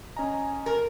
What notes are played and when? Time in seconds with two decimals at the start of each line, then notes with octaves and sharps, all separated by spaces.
0.17 C#4 D#5 G#5 A#5
0.66 A#4